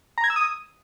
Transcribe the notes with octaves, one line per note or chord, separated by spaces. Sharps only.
A#5
G#6
E6
D#6